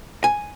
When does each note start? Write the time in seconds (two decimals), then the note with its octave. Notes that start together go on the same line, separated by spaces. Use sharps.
0.24 G#5